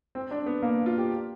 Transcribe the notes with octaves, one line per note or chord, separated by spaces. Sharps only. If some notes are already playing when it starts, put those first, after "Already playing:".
C4
D4
B3
A#3
F4
G4